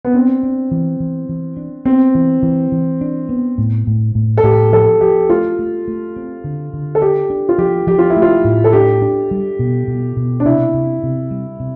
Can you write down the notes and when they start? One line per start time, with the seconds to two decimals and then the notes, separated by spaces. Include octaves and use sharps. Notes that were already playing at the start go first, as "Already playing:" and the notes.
0.05 B3
0.14 C4 D4
0.43 D4
0.71 E3
1.00 E3
1.29 E3
1.57 D4
1.85 B3 C4
2.15 E3
2.43 E3
2.72 E3
3.01 D4
3.29 B3
3.58 A2
3.87 A2
4.15 A2
4.37 A4
4.44 A2 G4
4.73 F3 A4
5.01 F3 G4
5.30 A3 F4
5.59 A3
5.88 A3
6.16 C4
6.44 D3
6.73 D3
6.95 A4
7.02 D4 G4
7.30 D4
7.49 F4
7.58 F3 G4
7.87 F3 G4
7.99 F4
8.10 E4
8.17 A3
8.22 F4
8.44 A2
8.64 A4
8.73 D4 G4
9.02 D4
9.31 G3
9.59 B2
9.88 B2
10.17 B2
10.40 D4
10.45 C3 E4
10.74 C3
11.03 C3
11.31 G3
11.60 C3